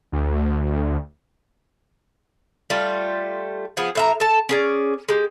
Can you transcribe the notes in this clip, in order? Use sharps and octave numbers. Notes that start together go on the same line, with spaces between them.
D2
G3 A3 F4
F3 B3 G#4
A2 E5 A#5
A4 A5
C#4 G#4 D5
G#3 G4